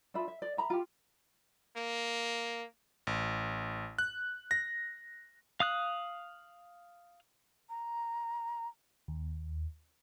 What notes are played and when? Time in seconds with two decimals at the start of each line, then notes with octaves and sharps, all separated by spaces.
0.14 D4 F4 E5 B5
0.28 E5
0.42 D5
0.57 E5 A#5 B5
0.70 F4 G4
1.77 A#3
3.07 A1
3.99 F#6
4.51 A#6
5.60 F5 D#6 F#6
7.69 A#5
9.08 D#2